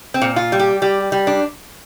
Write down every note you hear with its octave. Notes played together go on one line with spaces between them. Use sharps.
C4
A#2
F4
G3
G4
G3 G4
G3
D4